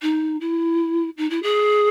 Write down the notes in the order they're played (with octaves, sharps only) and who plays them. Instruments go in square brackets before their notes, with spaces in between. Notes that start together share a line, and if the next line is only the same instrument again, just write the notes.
[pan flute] D#4
E4
D#4
E4
G#4